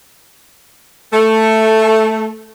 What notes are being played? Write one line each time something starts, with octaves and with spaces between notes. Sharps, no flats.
A3